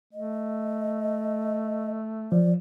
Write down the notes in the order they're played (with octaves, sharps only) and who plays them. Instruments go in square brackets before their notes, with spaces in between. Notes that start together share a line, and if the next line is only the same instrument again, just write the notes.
[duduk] A3 [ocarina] D#5
[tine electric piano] F3 [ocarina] D5